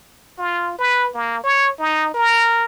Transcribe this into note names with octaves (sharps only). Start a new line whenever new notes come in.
F4
B4
A#3
C#5
D#4
A#4